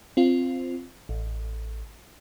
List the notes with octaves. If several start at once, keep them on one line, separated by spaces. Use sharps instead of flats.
C4 F4
A1